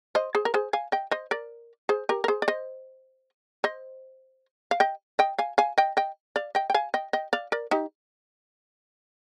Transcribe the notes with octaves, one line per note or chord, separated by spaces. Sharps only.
C5 D#5
G#4 C5
A#4
G#4 C5
F5 G#5
D#5 G5
C5 D#5
A#4 D5
G#4 C5
G4 A#4
A#4
G#4 C5
D5
C5 D#5
C5 D#5
F5
D#5 G5
D#5 G5
F5 G#5
F5 G#5
D#5 G5
D#5 G5
D5 F5
D#5 G5
G5
F5 G#5
D#5 G5
D#5 G5
D5 F5
A#4 D5
D#4 G4